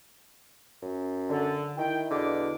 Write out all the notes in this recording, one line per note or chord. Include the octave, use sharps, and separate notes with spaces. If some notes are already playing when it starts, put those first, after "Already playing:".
F#2
D3
D#3 E4 G5
E2 B2 D3 D6